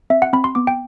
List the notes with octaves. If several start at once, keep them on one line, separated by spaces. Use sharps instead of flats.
C4 E5
F#5
C4 B5
C6
B3 D6
G5